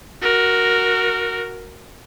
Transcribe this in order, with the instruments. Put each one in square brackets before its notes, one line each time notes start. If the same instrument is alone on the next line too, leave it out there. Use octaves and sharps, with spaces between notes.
[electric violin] F#4 A#4